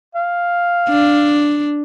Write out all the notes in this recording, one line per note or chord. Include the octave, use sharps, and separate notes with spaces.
F5
D4